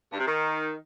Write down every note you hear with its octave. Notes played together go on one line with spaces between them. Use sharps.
G2
C3
D#3